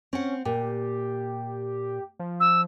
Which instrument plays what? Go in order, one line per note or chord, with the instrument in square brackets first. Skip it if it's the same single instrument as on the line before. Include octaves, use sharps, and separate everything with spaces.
[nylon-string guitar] C4 F#5 [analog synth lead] C#4
[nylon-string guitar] A#2 [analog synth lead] G4
[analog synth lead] F3
[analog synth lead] F3 [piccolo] E6